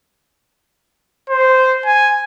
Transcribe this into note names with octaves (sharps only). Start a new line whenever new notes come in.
C5
G#5